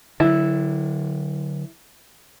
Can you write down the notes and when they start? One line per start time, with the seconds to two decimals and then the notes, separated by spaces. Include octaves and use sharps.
0.20 D3 F#3 E4